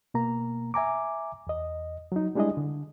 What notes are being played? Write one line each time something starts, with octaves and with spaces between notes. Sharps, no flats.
B2 A#3 A#5
E5 G#5 A#5 D6
E2 D#5
F#3 D#4
G3 G#3 D4 E4 G#4 D#5
D3